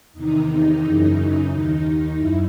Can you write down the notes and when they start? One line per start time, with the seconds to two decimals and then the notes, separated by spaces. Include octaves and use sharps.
0.13 E2 C3 D#3 D#4
0.82 F#2 C#3 E3
1.50 D#2 D#3 D#4
2.18 F#2 E4